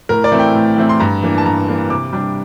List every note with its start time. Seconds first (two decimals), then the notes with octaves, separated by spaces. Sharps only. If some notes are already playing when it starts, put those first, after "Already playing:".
0.09 A2 A#4
0.24 D5
0.32 E3 A3 C4 E4
0.40 G5
0.55 A2
0.77 E3 A3 C4 E4
0.89 C6
1.00 G2 A#5
1.23 E3 A#3 D4
1.38 A5
1.45 G2 A#5
1.68 E3 A#3 D4
1.90 C3 D6
2.13 G3 D4